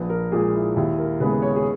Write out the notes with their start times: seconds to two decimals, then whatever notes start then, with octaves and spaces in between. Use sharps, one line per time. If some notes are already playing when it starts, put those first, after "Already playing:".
Already playing: A#1 B4
0.09 A#4
0.32 A#2 G#3 G#4
0.53 E4
0.76 D#2 E4
0.98 A#4
1.20 C#3 G#3 B3 B4
1.42 C#5
1.56 G#4